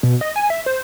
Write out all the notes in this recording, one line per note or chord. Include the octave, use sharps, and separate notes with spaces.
B2
D#5
G#5
E5
C5